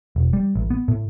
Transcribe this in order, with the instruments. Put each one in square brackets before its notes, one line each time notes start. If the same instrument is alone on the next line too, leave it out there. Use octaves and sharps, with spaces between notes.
[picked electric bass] E1
G3
A1
B3
A2